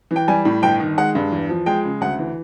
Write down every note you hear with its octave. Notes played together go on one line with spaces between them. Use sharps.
E3
G5
G3 G#5
A2
G1 G5
D#3
G#3 F#5
G2
E2
F3
G#3 G5
C#3
D2 F#5
E3